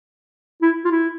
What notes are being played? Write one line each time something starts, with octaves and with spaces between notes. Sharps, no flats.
E4
F4
E4